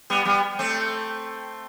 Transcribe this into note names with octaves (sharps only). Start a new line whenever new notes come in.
G3 B3
G3 B3
A3 C4